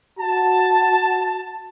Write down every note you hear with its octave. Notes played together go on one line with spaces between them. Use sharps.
F#4 A5